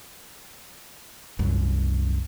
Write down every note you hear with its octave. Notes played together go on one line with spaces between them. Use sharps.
C2 F#2